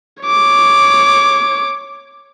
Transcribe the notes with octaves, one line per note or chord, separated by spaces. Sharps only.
C#5 D6